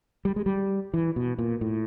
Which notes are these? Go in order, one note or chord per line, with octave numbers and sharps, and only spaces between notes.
G3
G#3
G3
E3
B2
A#2
A2